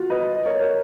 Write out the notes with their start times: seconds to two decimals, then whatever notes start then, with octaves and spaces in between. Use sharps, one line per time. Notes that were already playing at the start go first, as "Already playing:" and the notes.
Already playing: F4 F#4
0.10 B4 D#5
0.35 D#5
0.46 A#4 C#5
0.61 A#4 C#5